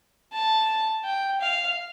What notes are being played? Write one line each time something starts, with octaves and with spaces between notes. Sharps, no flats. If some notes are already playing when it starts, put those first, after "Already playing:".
A5
G5
F5